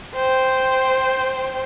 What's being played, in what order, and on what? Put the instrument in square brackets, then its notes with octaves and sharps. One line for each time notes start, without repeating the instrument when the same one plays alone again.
[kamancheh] C5 G5